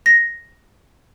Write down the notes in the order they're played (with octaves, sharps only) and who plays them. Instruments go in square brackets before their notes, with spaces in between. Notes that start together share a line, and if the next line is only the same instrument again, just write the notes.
[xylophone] A#6